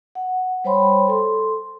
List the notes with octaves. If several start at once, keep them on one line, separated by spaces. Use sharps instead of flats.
F#5
G3 C5 C#5 G5 B5 C6
A4 C6